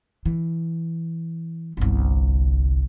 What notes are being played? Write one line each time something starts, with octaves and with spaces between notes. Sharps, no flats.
E3
G1 C2